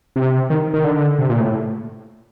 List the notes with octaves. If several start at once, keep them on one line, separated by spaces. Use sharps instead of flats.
C3
D#3
D#3
D3
C3
A#2
A2